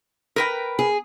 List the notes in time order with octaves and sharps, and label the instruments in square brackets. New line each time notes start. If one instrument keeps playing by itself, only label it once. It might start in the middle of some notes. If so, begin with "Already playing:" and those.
[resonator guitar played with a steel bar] A#4 B4 G5
[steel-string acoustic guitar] G#4